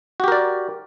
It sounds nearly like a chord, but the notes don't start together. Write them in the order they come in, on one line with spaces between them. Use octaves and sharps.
F#4 G4 A#4 D5